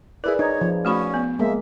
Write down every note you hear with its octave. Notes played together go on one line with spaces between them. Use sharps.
E4 G#4 A#4 B4 D5
D#4 C#5
F3
A3 C#4 F#4 B5
B3
G#3 A#3 E5